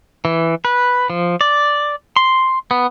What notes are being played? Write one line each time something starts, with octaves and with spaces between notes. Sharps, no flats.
E3
B4
F3
D5
C6
B3